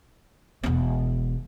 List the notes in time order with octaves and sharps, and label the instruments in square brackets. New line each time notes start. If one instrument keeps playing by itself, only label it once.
[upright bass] E1 B3